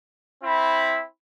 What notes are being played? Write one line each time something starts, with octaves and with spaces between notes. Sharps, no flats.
C4 E4 B5